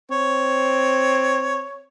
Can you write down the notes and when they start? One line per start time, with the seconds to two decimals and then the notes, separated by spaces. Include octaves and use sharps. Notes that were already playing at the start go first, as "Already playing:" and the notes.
0.11 C4 C#5